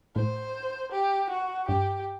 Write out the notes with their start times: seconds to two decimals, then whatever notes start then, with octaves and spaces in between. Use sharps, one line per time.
0.16 A2 C5
0.92 G4
1.30 F#4
1.68 G2 G4